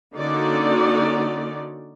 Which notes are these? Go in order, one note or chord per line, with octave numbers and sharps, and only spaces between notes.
D3 A#3 C#4 D#4 F#4 D5